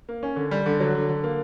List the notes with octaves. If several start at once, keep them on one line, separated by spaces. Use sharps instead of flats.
A#3
C#4
D3
G3
D3
F#3
D3
D3
A#3